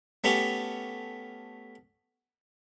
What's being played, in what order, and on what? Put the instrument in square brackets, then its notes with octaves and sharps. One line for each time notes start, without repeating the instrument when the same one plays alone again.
[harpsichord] A3 B3 C#4 G4